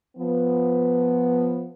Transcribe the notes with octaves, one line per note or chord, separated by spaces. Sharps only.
F3 B3